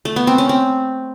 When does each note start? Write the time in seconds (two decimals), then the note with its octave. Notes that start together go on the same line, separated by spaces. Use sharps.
0.05 A3
0.16 B3
0.27 C4
0.38 C#4
0.49 C4